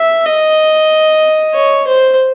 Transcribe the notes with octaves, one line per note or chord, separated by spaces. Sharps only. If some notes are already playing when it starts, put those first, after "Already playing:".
Already playing: E5
D#5
C#5
C5